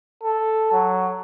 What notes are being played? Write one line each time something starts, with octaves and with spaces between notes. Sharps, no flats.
A4
F#3